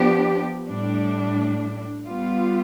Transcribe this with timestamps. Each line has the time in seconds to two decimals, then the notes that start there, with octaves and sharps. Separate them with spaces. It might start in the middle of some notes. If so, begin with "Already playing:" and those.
Already playing: F3 B3 D4 G4
0.68 A2 G3 D4
2.06 G3 B3 F4